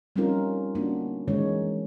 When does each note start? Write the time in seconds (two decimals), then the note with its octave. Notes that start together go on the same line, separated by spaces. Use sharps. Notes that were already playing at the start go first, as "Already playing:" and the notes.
0.16 G3 C4 C#4 D#4 F4 A#4
0.75 A#3 B3 C#4 D4 F#4
1.28 D#3 E3 G#3 C#4 D#4 C#5